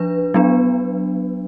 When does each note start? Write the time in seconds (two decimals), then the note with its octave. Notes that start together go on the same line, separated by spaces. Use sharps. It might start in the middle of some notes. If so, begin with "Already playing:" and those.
Already playing: F3 D4 B4
0.34 F#3 B3 D4